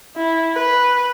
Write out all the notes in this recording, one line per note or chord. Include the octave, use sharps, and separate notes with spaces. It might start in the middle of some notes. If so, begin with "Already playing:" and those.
E4
B4